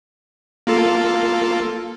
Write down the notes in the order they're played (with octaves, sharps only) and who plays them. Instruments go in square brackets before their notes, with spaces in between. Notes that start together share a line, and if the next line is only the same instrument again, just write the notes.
[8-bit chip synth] A#3 F4 A4